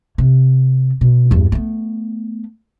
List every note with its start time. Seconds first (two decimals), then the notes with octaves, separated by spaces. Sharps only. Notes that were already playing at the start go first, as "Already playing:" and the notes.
0.18 C3
1.01 B2
1.31 E2 G2
1.52 A3 B3